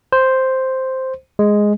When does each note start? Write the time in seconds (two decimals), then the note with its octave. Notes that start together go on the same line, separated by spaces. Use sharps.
0.12 C5
1.39 G#3